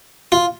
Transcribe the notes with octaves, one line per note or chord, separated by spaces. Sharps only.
F4